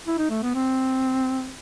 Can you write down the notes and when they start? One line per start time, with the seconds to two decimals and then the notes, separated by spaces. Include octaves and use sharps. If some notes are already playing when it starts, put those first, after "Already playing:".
0.07 E4
0.19 D#4
0.31 A3
0.43 B3
0.55 C4